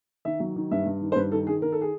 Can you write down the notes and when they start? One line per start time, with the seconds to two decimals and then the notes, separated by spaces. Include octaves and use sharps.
0.25 D#3 E5
0.40 F#3
0.56 D#3
0.71 G2 E5
0.86 G2
1.01 D#3
1.12 C5
1.16 G2 B4
1.32 D#3 A4
1.47 D#3 G#4
1.62 D#3 A#4
1.72 A4
1.81 G#4